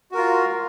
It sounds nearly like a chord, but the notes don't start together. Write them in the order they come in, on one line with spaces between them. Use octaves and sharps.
F#4 A#4 F4